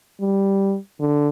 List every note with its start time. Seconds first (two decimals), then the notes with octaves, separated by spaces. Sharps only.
0.20 G3
1.00 D3